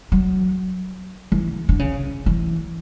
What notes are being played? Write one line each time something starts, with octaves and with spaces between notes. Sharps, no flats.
F#3
E3
D3
C#3
E3